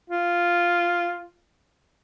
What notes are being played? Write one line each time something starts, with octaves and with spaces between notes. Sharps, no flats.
F4